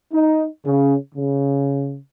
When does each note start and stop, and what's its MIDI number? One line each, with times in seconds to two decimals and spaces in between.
0.13 0.45 63
0.65 0.95 49
1.15 1.98 49